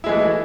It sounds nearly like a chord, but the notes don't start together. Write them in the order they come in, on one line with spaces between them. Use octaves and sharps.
E4 G#3 E3 A3